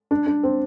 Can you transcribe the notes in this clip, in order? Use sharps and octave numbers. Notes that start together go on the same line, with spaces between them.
D4
D4
C4